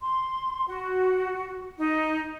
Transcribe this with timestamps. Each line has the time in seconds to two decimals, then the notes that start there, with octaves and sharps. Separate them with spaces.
0.01 C6
0.67 F#4
1.78 D#4